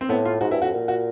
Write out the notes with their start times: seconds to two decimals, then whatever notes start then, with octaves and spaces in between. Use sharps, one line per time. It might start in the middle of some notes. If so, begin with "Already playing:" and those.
0.01 C4
0.09 A2 B3
0.25 F4
0.41 G#2 F#4
0.51 G2 E4
0.62 F2 F#4
0.73 A#2
0.88 F#4